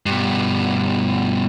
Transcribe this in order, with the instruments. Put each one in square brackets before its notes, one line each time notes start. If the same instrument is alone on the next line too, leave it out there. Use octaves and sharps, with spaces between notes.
[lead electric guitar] G2 B2